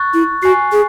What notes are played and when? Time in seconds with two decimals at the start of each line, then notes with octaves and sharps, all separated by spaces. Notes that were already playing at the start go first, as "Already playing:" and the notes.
Already playing: C#6 F#6 A6
0.14 E4
0.43 F#4 G#5 C#6 F#6 C7
0.72 G#4